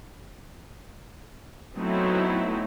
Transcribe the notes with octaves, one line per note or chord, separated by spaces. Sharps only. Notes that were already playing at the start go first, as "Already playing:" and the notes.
F#3 A3 B3 C4 D#4 E4